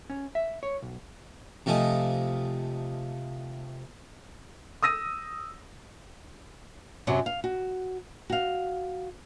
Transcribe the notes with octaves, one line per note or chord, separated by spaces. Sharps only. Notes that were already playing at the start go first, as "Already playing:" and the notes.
C#4
E5
C#5
B1
C3 F3 A3 D#5 G#5
D#6 E6 A#6 D#7
F#2 C3 F#3
F5
F#4
F#4 F5